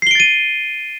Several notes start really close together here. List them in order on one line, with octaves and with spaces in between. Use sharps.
C7 G7 D7 A6 D#7